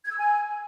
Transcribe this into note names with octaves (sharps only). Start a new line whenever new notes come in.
G#6
E6
G#5